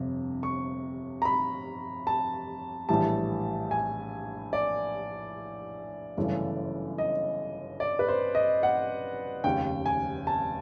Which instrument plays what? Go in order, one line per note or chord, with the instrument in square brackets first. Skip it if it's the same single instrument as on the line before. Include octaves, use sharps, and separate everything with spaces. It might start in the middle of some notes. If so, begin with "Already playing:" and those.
Already playing: [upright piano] G1 F2 C3
C#6
A#5
B5
A5
A#1 A2 E3 G3 A5
G#5
D5
G1 F#2 C#3 E3 A3
D#5
D5
B4
C5
D#5
F#5
F1 D#2 C#3 G5
G#5
A5